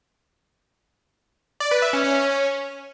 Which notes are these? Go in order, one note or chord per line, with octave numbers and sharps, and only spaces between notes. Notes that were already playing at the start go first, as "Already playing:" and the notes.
D5
B4
E5
C#4
C#4